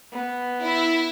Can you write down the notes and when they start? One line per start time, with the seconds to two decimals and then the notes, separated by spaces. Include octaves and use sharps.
0.12 B3
0.64 E4